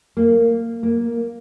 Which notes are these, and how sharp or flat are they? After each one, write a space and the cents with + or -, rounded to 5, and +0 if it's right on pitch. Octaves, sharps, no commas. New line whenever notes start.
A#3 -15
A#3 +5